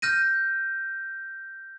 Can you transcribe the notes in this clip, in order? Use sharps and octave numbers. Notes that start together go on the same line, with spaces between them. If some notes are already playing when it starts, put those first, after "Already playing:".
F6 G6 A#6 D#7